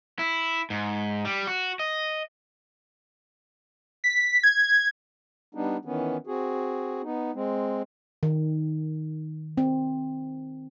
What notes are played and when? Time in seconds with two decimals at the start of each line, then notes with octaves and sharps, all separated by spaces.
0.19 E4
0.70 G#2
1.25 G3
1.47 F#4
1.79 D#5
4.04 B6
4.43 G#6
5.55 G3 B3 D4 D#4
5.85 D#3 E3 B3 C#4
6.27 C4 F#4 G#4
7.03 B3 D#4
7.34 G#3 C4
8.23 D#3
9.57 C4